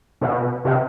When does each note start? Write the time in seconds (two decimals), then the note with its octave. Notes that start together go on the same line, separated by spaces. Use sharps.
0.21 B2
0.65 C3